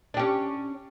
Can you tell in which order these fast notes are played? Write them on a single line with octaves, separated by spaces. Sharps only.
D4 G4 C#4